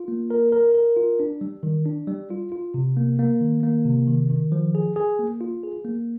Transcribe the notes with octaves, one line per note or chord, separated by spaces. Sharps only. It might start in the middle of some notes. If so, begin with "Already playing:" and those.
Already playing: F4
A#3
A#4
A#4
A#4
F4
D4
G3
D#3
D4
G3
F4
F4
C3
A#3
A#3
D#3
A#3
C3
D#3
D#3
F3
G#4
G#4
A#3
F4
G#4
A#3